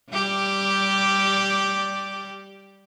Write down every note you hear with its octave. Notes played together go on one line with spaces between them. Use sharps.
G3 G4 D5